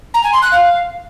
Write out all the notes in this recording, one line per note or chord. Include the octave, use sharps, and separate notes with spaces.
A#5
G#5
C6
F#6
F5